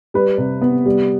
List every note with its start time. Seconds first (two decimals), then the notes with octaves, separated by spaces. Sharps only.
0.14 G3 B4
0.38 C3
0.62 B3
0.86 G3